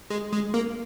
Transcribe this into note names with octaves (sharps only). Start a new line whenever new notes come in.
G#3
G#3
A#3